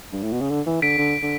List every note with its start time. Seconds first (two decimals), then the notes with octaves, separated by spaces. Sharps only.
0.13 G2
0.22 A2
0.32 B2
0.40 C#3
0.50 D3
0.66 E3
0.82 D3 B6 D7
0.98 D3
1.22 D3